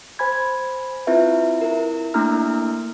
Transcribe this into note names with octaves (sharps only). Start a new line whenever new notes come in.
C5 G#5 B5 G#6
C4 E4 F4 B4 E5
E4 A#4
A3 A#3 D4 E4 A#5 F6